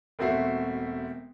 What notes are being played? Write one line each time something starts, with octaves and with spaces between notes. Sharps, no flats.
E1 A3 C4 F#4 E5 C7